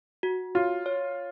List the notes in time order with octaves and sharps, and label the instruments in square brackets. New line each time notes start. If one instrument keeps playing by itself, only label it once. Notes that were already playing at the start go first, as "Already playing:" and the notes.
[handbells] F#4
[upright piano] F4 [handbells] C#5
[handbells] C#5